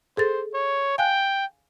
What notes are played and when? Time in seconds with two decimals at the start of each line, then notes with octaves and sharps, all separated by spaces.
0.17 G#4 A4 C5 A6
0.54 C#5
0.98 F5 G5 G#5 F#6